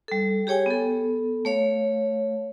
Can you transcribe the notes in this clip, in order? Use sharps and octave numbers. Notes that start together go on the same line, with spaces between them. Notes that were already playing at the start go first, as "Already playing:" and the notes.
G3 A4
G4 G#4 C#5 G5 G#5
B3 A4
A3 C#5 F5